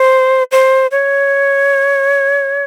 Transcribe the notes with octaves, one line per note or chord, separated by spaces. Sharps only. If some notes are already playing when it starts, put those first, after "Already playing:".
Already playing: C5
C5
C#5